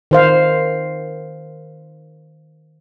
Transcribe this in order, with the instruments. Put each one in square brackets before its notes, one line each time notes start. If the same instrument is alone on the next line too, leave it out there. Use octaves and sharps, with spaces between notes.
[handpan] D#3 C5 F5